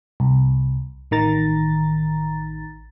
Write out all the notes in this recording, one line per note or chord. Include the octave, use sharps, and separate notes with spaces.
C2
A1 D#3 A#5 A6